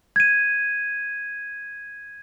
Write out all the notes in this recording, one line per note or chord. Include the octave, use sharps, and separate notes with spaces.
G#6 D#7